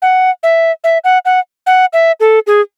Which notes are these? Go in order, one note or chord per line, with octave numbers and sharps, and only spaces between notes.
F#5
E5
E5
F#5
F#5
F#5
E5
A4
G#4